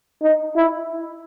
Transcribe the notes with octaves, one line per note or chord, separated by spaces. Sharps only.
D#4
E4